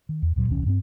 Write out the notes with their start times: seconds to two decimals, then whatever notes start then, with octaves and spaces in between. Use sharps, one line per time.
0.09 D#3
0.22 E2
0.36 D2 A#2 F#3
0.48 D#1 C2 E3 C#4
0.66 G2 B3 C4